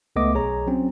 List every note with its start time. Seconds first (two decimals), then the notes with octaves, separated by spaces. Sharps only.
0.16 C#2 A3 B3 D#5 D6
0.34 B1 G#4 C#5 A#5
0.67 F#3 C4 C#4